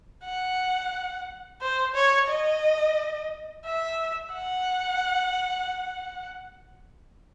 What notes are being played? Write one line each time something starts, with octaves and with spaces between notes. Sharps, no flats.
F#5
C5
C#5
D#5
E5
F#5